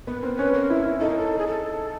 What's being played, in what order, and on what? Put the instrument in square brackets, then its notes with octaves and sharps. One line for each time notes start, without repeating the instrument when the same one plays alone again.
[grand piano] B3 [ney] B4
[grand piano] C4 [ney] A#4
[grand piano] C#4 [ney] B4
[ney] A#4
[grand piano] E4
E4
[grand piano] D#4 [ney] A4
[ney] A#4
A4
G#4
A4